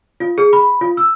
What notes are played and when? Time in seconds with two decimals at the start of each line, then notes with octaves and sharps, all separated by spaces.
0.20 F4
0.38 G#4
0.53 B5
0.81 F4
0.97 E6